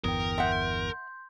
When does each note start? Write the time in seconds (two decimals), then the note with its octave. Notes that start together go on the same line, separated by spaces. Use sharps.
0.04 G1 E2 A#4 G5 D#6
0.38 E5 F#5 C6 G6